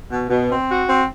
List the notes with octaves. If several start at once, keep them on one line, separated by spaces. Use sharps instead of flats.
B2
B2
C4
F#4
C4